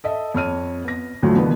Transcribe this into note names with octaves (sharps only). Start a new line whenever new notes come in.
A4 D#5 E5
F2 C#5 F6 D#7
B3 A#6
D2 A2 F3 F#3
B2 D3 E3 A#3 B3